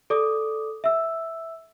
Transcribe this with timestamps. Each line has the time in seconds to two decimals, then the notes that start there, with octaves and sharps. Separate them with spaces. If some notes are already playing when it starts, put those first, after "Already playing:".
0.10 A4 D5 D6 D#6
0.84 E5 E6